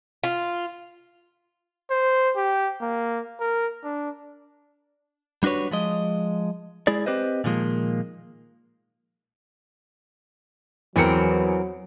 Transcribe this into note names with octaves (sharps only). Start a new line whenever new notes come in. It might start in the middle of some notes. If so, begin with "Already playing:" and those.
F4
C5
G4
A#3
A#4
D4
G3 D4 F#4 B4 C#5
F3 G#3 D#5
G#3 E4 G#4 D5
C4 G4 B4 C5 D#5
A#2 D3 D#3 F3 G#3 A#3
E2 E3 F#3 C4 A#4 C#7